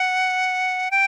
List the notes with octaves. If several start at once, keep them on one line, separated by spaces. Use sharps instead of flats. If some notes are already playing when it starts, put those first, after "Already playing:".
Already playing: F#5
G5